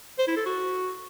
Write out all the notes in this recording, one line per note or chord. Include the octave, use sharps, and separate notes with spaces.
C5
E4
A4
F#4